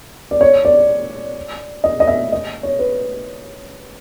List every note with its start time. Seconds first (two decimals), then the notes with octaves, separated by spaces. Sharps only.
0.31 D5
0.41 C#5
0.65 D5
1.84 D#5
2.00 D#5
2.07 E5
2.32 D#5
2.63 C#5
2.79 B4